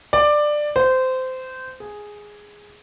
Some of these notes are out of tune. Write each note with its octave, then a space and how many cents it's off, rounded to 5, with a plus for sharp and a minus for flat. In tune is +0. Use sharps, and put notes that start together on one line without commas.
D5 +15
C5 -20
G#4 +0